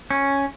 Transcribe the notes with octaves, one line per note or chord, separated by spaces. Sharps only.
C#4